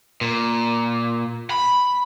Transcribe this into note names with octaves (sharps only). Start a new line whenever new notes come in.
A#2
B5